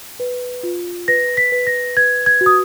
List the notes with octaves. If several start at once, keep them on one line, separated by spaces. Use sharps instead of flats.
B4
F4
B4 A#6
B6
B4
A#6
B4 G#6
G#6
F#4
D#6